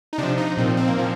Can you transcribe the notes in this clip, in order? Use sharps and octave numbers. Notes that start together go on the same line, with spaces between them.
D#4
C3 F3 D4
D#4
A#2 F3 C4
C4
A#3
A#2 F3 C4